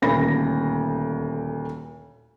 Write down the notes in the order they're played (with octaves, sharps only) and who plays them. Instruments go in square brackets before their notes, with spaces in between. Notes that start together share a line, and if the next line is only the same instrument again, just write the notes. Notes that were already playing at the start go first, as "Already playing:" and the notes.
[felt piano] D#1 D2 B5 A#6